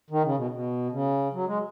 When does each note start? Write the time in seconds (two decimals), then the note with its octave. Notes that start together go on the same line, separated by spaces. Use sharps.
0.10 D#3
0.24 C#3
0.37 B2
0.51 B2
0.91 C#3
1.33 F#3
1.46 G#3